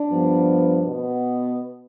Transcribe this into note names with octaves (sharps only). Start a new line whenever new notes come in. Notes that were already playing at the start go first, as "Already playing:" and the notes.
Already playing: D4
G2 F3 B3
B2 B3